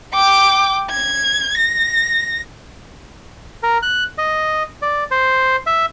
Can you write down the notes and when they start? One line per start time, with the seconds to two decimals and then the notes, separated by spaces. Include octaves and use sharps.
0.13 G5 D6
0.91 G#6
1.57 A#6
3.63 A#4
3.83 F#6
4.18 D#5
4.82 D5
5.11 C5
5.67 E5